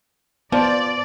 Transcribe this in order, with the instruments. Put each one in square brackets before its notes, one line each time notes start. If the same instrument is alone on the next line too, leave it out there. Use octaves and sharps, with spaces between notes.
[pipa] F3 [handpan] B3 [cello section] D5